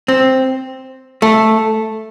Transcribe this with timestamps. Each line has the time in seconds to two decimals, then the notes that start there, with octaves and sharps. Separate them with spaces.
0.08 C4
1.22 A3